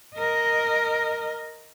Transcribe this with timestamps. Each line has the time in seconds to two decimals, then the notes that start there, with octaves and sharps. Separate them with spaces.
0.16 A#4 D#5